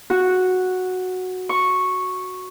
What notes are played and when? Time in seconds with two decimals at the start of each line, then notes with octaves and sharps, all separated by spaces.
0.10 F#4
1.49 C#6